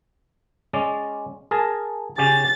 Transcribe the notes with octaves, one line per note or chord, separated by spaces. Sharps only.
G#3 C#4 D5
G#4 A#4 A5
C#3 C#4 G4 A6